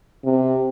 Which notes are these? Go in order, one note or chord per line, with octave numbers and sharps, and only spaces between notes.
C3